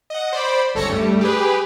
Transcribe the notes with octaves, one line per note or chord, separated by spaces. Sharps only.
D#5 F#5
C5 D5 B5
G1 C#2 A4 C#5 A#6 C#7
G2 G3 A3
G4 G#4 B4